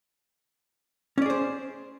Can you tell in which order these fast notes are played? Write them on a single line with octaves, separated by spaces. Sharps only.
C#4 D5 G#4 C5